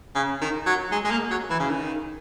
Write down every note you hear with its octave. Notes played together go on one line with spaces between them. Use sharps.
C#3
D#3
F#3
G#3
G#3
A#3
F#3
E3
C#3
D#3